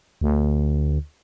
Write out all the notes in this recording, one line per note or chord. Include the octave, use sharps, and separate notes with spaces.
D2